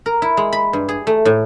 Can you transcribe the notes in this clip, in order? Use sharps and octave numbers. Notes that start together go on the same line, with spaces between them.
A#4
E4
G#3
B5
G2
G#4
A3
A2